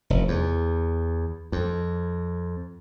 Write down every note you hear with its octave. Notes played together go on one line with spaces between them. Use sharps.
F1
E2
F2